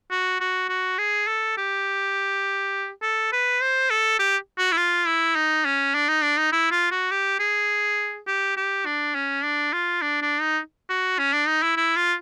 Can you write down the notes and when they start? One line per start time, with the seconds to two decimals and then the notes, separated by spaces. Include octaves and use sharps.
0.11 F#4
0.40 F#4
0.69 F#4
0.98 G#4
1.27 A4
1.57 G4
3.02 A4
3.32 B4
3.61 C5
3.90 A4
4.19 G4
4.58 F#4
4.72 E4
4.77 F4
5.06 E4
5.36 D#4
5.65 C#4
5.94 D4
6.09 D#4
6.23 D4
6.38 D#4
6.52 E4
6.72 F4
6.91 F#4
7.11 G4
7.39 G#4
8.27 G4
8.57 G4
8.86 D4
9.15 C#4
9.43 D4
9.73 F4
10.02 D4
10.22 D4
10.41 D#4
10.89 F#4
11.18 C#4
11.33 D4
11.47 D#4
11.62 E4
11.77 E4
11.96 F4